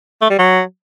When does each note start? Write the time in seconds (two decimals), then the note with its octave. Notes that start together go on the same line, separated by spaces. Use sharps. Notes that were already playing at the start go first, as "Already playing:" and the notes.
0.22 A3
0.30 G3
0.39 F#3